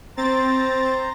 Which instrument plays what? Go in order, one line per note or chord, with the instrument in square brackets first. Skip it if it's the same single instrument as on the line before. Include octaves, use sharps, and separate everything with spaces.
[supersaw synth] C4 A6 [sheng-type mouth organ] C5 A#5